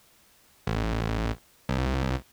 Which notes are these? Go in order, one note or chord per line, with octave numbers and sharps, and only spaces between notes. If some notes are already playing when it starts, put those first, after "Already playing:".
A1
C2